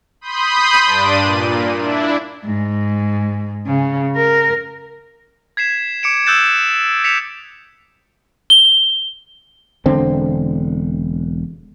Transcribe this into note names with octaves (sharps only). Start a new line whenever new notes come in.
B5 C6 D#6 G6
G2 D4 D5 D#7
A#2
D4 E4
G#2
C#3
A#4
G#6 B6 C7 E7
D6 C#7 D7 E7
D#6 E6 F#6 G6 A6 E7
B6 C#7 E7 F7
G7
E1 D3 C4